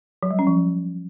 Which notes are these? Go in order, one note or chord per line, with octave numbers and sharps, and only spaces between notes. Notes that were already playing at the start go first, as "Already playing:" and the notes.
F#3
G3
C#4
F3